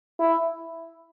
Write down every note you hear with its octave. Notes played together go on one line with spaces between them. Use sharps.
E4